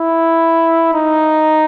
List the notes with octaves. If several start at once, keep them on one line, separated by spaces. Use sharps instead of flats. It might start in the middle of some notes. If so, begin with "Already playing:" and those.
Already playing: E4
D#4